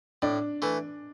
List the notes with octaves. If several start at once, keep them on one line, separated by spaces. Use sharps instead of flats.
A2 D4 D5
E3 A3